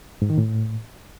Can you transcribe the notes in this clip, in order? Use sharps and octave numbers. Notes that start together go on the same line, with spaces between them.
G#2
D#3
A2